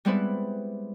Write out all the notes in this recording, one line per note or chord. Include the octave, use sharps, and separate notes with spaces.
G3 G#3 B3 C4 E4 B4